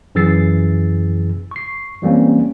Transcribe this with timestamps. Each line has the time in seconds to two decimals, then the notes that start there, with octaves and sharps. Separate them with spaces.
0.15 F#2 E3 G#4 E6 A6 C7
1.51 C#6 C7
2.02 E3 G3 A#3 C4 C#4